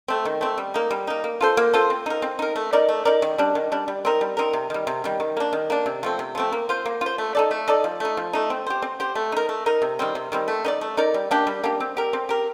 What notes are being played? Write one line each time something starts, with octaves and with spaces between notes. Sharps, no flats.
A3 C4
D#3
A3 C4
G3
A#3 D#4
G3
A#3 D#4
A#3
F4 A4 C5
A#3
F4 A4 C5
C4
D#4 A#4
C4
D#4 A#4
A3
D#4 A#4 D5
A3
D#4 A#4 D5
D#3
G3 D4
D#3
G3 D4
G3
C4 D#4 A#4
G3
C4 D#4 A#4
C3
D#3 G3
C3
D#3 G3
D#3
A#3 D4
D#3
A#3 D4
C3
F3 A3 C4
C3
F3 A3 C4
A#3
F4 C5
A#3
F4 C5
A3
D#4 A4 D5
A3
D#4 A4 D5
F3
A3 D#4
F3
A3 D#4
C4
G4 C5
C4
G4 C5
A3
D#4 A#4
A3
D#4 A#4
C3
D#3 G3 C4
C3
D#3 G3 C4
A3
D#4 A#4 D5
A3
D#4 A#4 D5
G3
A#3 D4 G4
G3
A#3 D4 G4
C4
G4 A#4
C4
G4 A#4